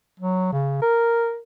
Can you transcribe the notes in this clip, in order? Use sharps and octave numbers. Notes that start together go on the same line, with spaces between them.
F#3
C#3
A#4